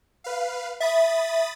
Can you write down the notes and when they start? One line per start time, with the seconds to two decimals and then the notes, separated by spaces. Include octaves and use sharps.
0.24 B4 F5
0.80 E5 B5 D#6 A6